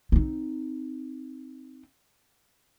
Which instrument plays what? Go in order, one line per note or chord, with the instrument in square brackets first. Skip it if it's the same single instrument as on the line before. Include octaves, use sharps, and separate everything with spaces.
[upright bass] C4 D#4